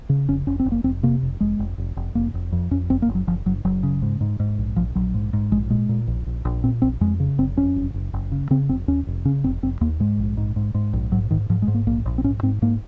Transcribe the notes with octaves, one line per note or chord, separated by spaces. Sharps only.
C#3
F1 C#4
F1 C#4
C4
F1
A#3
F1 C4
C3 A#3
F1
F1 G#3
F1
F1
F1
F1 A#3
F1
F2
F2 C#4
F#1 C4
A#3
F#1
F#3
F#1 F3
F#1 F#3
F#1 F#3
C#3
G#2
G#2
G#2
A#1
A#1 F3
A#1 F#3
G#2
G#2
A#1 G#3
A#2 G#3
A#2
A#1
A#1
A#1
A#2 C4
A#1 C4
F2 G#3
C#3
F#1 C4
F2 C#4
F#1
F#1
F#1
C#3
C#3 C4
F1 C4
D#2 C#4
F1
C#3 C#4
F1 C4
F1 C4
D#2 A#3
G#2 G#3
A#1
G#2
G#2
G#2
A#1
G#2 F#3
G#2 D#3
G#2 F3
G#3
G#2
A#3
A#1 A#3
A#1
C4
G#2 C#4
G#2 C4
G#2 A#3